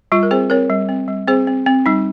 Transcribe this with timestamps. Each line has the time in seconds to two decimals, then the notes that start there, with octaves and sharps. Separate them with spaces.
0.12 G3 F4
0.23 A#4
0.31 C4 G#4 C5
0.50 C4 A#4 C#5
0.70 G3
0.89 C4
1.08 G3
1.27 C4 G#4 C5
1.47 C4
1.66 C4
1.86 G3 D#4